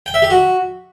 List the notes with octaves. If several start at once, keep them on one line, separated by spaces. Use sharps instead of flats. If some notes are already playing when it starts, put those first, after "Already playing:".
G5
E5
G4
F#4